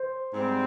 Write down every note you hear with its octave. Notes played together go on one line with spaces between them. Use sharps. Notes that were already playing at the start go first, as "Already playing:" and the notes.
Already playing: C5
G#2 G3 C4